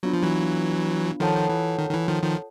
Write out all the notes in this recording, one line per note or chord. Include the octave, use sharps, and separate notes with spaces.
F#3 B3 D4 F4
F3
E3 F#3
D#3 F3 F4 A4 C#5 F#5 A5
E3
D#3
D#3
E3
D#3 F3
D#3 F3